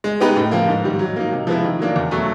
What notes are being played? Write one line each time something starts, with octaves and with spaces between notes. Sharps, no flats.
G#3
B3 D#4 G4 B4
A2
F3 A#3
G#2
D#3 G3
F#3
A#3 D#4
C3
F3 G#3 B3 E4
D#3
F#3 A#3 D4
E2
B2 F#3 A3